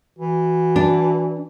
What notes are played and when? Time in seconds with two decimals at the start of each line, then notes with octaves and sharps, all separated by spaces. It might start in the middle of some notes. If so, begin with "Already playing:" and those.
0.19 E3 F#4
0.76 D4